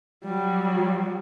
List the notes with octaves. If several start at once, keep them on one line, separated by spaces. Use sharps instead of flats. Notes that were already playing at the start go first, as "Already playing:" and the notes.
F#3 G3